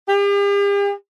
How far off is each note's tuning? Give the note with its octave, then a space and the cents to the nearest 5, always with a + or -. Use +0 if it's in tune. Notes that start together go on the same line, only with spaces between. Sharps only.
G4 +45